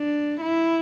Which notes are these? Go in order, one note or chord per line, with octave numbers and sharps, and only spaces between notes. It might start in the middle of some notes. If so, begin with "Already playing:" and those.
Already playing: D4
E4